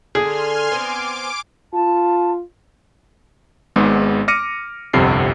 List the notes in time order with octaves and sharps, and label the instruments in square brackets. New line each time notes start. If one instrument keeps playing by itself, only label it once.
[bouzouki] D3 [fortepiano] G#4 [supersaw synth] G#5 C6 F6
[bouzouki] B3 C4 [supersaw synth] D6 D7
[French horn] F4 [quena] A5
[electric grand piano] G#1 G#2 G#3 B3
D6 F6 A#6 C#7 D#7
G1 C2 F2 C3 C7